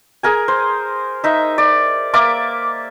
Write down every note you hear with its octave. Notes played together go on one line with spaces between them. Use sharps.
G#4 A#4 G#5
C5
D#4 E5
D5
A#3 D5 E5 D6